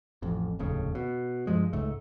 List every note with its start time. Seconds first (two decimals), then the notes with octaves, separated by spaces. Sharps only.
0.22 A1 F2
0.59 F1 D#2 A2 C#3
0.95 B2
1.47 G2 F3 G#3
1.73 C#2 G#2 A3